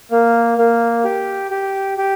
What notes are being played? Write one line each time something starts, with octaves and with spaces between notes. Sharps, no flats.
A#3
A#3
G4
G4
G4